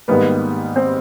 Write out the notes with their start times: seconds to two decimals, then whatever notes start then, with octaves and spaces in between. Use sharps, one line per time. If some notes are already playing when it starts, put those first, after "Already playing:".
0.08 G#2 D#3 G3 A#3 B3 B4
0.76 C4 C5